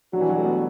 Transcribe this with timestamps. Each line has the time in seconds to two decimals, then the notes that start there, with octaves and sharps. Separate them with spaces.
0.12 B2 F#3 G3 D4 F#4
0.21 E3
0.29 F#3
0.37 A3
0.45 B3